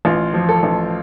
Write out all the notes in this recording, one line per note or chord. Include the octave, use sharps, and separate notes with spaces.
A1 F4
F3
A4
A1